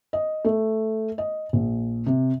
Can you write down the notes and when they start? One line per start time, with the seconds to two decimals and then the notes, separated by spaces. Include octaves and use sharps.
0.13 D#5
0.45 A3
1.18 D#5
1.53 A#1
2.06 C3